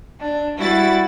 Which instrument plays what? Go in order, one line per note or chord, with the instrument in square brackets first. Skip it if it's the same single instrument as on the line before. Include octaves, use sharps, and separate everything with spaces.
[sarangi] D4
[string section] G3 E4 A6 [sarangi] F#4